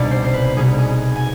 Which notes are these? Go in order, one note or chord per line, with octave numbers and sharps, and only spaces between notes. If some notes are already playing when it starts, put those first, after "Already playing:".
Already playing: C2 B2 B3 D#4 D5
C5
C5
B4
C2 B2 B3 D#4 G#4
G#4
G#5